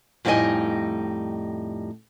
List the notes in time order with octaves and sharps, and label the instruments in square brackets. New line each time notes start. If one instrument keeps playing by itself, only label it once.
[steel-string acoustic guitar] F2 A2 G3 D#4 D#5 G#5